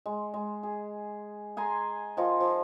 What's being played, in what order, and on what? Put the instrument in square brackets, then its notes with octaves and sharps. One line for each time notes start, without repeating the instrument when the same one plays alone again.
[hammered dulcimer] G#3
G#3
G#4
G#4 G#5 A#5 C6
D#3 F3 D#4 F4
F3